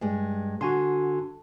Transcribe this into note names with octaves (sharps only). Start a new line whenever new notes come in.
G2 G#3
D3 F#4 G#5 C6